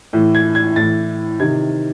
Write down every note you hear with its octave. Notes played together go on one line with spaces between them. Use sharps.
A2 E3
G#6
G#6
A2 E3 A6
C3 D#3 G#6